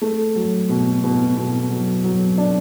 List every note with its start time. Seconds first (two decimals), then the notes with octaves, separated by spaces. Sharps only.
0.02 A3
0.36 F#3
0.69 B2
1.04 B2
1.37 B2
1.70 F#3
2.04 F#3
2.38 D4